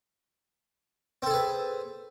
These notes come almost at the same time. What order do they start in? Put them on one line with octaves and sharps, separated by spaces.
C4 A4 G#4 B4